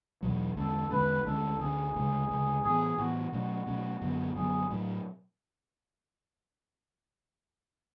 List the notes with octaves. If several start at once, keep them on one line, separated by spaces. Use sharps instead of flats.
E2 B2 F#3
E2 D3 G#3 C#4 A4
E2 D3 G#3 C#4 B4
D2 D3 G#3 C#4 A4
D2 D3 G#3 C#4 G#4
D2 C#3 G#3
D2 C#3 G#3
A2 E3 B3 G#4
A2 E3 B3 F#4
B2 F#3 A3 C#4
B2 F#3 A3 C#4
F#2 D3 F#3 B3
F#2 D3 F#3 B3 G#4
A2 F#3 A3